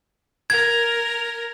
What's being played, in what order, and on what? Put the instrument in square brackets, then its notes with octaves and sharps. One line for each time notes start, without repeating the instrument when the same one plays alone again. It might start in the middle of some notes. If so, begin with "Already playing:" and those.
[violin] A#4 [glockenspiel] G#6